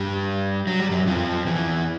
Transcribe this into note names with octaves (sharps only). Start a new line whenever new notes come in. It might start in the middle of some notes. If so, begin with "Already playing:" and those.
Already playing: G2 G3
F#3
G3
F#2 F#3
F2 F3
E2 E3